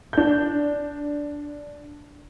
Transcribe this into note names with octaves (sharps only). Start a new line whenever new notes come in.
D4 G6